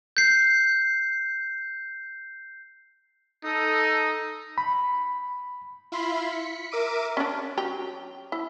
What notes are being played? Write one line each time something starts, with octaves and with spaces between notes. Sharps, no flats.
G6 C7
D#4 A4 D#6
B5
E4 F4 B5 C6
B6 C#7
A#4 E5 D6 D7 D#7
C#4 D4
F#3 G4 A#5
E4